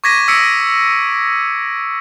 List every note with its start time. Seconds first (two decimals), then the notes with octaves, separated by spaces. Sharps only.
0.04 C#6 D6 G#6 A#6 B6 D#7
0.28 D#6 E6 B6 C#7 D7